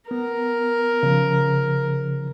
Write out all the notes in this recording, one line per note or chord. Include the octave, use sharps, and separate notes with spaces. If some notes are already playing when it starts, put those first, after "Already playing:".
B3 A#4
C#3 F3